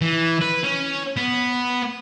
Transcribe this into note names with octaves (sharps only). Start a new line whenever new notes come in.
E3
B4
C#4
B3